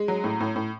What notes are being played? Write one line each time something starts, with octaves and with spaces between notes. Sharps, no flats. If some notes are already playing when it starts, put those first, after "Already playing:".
Already playing: G#3
F#3
A2
A2
A2